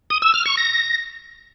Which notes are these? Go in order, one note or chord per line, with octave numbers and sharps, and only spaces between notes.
D#6
E6
F6
C#6
A#6